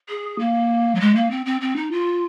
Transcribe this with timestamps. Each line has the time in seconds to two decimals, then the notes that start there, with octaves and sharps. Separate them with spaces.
0.09 G#4
0.39 A#3
0.95 F#3
1.00 G#3
1.15 A#3
1.31 C4
1.46 C4
1.61 C4
1.76 D#4
1.92 F4